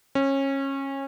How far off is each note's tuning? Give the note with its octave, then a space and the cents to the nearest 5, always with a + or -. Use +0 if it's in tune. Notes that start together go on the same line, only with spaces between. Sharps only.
C#4 -25